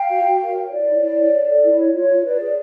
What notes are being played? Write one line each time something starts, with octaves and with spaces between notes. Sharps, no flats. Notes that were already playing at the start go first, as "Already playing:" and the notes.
Already playing: F5 G5
F#4
F#4
A#4
C#5
E4 D5
C#5
E4
C#5
C#5
A4
E4
C#5
F4 C#5
F4
B4 D5
G#4